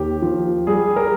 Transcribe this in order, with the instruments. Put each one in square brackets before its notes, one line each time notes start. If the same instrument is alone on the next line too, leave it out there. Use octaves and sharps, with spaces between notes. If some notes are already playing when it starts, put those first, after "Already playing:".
Already playing: [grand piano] D#2 G4
F3
G3 G#4
A#4